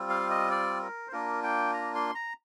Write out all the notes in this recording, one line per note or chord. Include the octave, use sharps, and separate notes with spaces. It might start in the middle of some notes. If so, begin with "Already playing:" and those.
Already playing: G3 C4 F4
F5
D#5
D5
A#4
C5
A#3 D4 F4 A#4
G5
A#5
C6
A#5